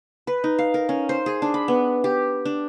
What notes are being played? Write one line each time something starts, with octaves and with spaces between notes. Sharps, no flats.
B4
D#4
F5
A#4
C#4
C5
G#4
D4
B5
B3
G4
D4